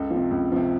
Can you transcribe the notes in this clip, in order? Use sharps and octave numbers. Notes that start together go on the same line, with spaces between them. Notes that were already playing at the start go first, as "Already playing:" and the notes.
Already playing: C#2 A4
F3
C3
C#2
C3 F3